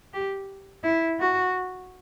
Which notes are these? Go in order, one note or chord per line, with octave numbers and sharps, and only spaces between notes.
G4
E4
F#4